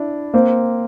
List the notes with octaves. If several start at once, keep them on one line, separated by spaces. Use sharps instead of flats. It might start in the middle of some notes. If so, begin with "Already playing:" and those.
Already playing: D4 E4
A#3 C4